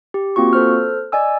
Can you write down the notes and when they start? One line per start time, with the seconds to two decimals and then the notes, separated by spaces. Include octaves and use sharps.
0.14 G4
0.36 A#3 C4 F4 F#4 C#6
0.53 A4 C5 F6
1.12 D5 D#5 G#5 E6